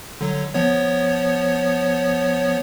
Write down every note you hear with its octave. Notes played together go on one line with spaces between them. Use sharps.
D3 F#3
F3 B3 C#5